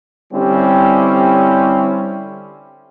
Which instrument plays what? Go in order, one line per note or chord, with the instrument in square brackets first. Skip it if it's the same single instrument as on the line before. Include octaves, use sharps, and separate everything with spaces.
[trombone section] D3 G3 C4 C#4 E4 G4